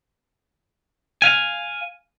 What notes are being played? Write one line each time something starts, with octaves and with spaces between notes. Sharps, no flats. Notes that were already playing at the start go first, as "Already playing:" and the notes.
F5 G#5